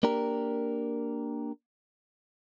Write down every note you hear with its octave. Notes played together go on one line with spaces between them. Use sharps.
A#3 D4 G4 A#4